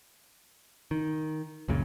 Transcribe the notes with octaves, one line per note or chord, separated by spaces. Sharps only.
D#3
C#2 F#2 A#2 C#3